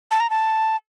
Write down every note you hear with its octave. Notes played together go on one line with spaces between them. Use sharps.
A5
A#5
A5